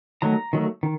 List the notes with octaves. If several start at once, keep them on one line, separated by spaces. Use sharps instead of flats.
D#3 F#3 A3 A#5
D#3 F#3 A3
D#3